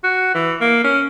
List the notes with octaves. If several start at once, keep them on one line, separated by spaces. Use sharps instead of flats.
F#4
E3
A#3
C#4